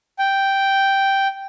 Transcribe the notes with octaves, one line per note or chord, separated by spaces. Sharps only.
G5